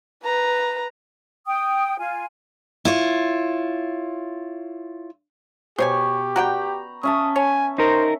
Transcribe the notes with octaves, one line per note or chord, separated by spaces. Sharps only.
B4 A#5
G5 D#6
F4 G#5
E4 F4 C#5
B2 G4 C5 C#5 G#5 B5 C#6
F#4 D5 G5 A#5 B5
C#4 E5 A5 D#6
C#5 G#5
D#4 A#4 C5